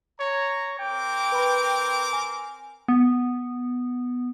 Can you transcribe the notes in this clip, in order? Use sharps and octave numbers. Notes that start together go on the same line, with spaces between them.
C#5 A#5
C4 A#4 G5 D6
B4 B5
G#5
B3